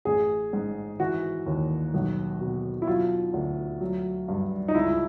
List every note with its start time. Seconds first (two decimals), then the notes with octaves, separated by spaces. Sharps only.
0.05 A1 G#4
0.53 G#2
1.00 E3 F#4
1.46 D#2
1.94 B1
2.41 B2
2.82 E4
2.87 F#3 F4
3.34 D2
3.81 F#3
4.28 G2
4.68 D#4
4.75 C#2 E4